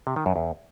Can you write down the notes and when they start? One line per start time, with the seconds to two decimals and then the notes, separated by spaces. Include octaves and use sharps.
0.07 C3
0.16 D#3
0.26 F#2
0.36 E2